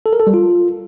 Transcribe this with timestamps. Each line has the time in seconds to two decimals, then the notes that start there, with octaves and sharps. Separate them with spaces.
0.06 A4
0.13 A#4
0.20 A4
0.27 G3
0.34 F4